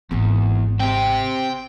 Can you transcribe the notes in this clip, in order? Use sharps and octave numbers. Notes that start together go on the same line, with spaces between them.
G#1 E2 B3
C4 G4 G5